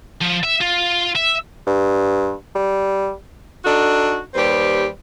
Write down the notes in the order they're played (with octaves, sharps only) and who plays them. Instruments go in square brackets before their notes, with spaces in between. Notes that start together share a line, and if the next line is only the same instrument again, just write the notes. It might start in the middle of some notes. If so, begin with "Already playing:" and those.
[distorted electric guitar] F3
E5
F4
E5
[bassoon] G2
G3
[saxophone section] D4 D#4 F#4 A4
D#2 G3 G4 B4 C5